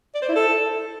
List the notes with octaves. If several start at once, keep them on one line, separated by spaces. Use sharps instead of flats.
D5
C5
E4
A4